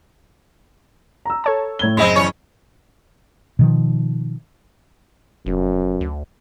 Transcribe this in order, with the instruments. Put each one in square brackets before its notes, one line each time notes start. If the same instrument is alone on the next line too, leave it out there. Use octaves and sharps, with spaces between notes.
[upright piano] A#5 E6
[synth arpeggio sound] A4 C#5 A5
[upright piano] A2 G#6 G7
[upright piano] F#1 [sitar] G#3 A#3 C4 [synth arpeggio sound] D#5 B5
[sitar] E2 C#4 C#5
[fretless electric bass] B2 D#3 F3
[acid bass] F1 [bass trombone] F#2
[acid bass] D2